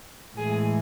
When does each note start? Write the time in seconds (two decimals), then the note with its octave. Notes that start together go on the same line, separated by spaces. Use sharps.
0.35 A2 E3 G#3 G#4